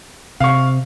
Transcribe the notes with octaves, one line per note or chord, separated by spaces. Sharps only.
C3 F5 C#6